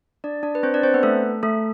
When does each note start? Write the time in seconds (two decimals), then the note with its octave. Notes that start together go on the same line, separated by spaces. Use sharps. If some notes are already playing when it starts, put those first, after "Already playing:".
0.24 D4 D5
0.43 D4 D5
0.55 B4
0.63 C4 C5
0.74 D4 D5
0.83 C4 C5
0.94 B3 B4
1.03 A3 A4
1.43 A3 A4